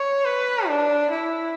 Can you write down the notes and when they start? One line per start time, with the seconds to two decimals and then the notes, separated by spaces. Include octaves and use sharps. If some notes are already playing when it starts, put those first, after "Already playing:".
Already playing: C#5
0.25 B4
0.68 D4
1.11 E4